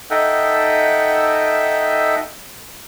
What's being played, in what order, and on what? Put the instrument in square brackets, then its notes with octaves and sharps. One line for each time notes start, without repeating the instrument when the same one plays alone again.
[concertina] D#4 A4 D#5 E5 F#5 G5